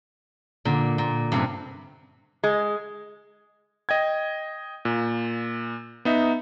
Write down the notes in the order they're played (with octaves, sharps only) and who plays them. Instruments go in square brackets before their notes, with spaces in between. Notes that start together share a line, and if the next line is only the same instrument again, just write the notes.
[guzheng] A#2 D3
A#2
G2 C3 B4
[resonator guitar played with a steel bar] G#3
[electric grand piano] D#5 G5 G#6
A#2
B3 D#4 E5